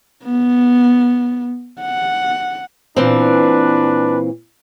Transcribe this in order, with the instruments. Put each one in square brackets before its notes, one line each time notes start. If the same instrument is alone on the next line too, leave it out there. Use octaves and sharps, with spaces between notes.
[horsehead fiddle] B3
F#5
[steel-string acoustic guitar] A#2 E3 C4 [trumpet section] D4 B4